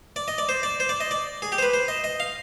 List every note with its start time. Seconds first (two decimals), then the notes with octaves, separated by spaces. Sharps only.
0.16 D5
0.28 D#5
0.38 D5
0.49 C5
0.63 D5
0.80 C5
0.89 D5
1.00 D#5
1.11 D5
1.42 G#4
1.52 G4
1.58 C5
1.63 B4
1.74 C5
1.88 D#5
2.04 D#5
2.20 F5